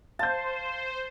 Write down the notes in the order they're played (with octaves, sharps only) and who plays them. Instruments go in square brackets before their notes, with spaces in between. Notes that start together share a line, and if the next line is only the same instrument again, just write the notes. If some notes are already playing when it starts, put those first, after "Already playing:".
[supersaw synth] C5 [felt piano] F5 G6 [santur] A5